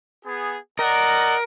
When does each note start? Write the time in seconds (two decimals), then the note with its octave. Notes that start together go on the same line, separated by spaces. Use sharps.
0.25 B3 G#4
0.79 A#4 D5 D#5 F#5